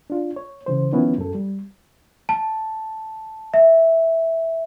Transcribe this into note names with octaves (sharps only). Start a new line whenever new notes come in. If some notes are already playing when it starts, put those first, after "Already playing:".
D4 F4
C#5
C#3 E3 C5
D#3 F3 B3 C#4 E4 B4
F#2 A4
G3
A5
E5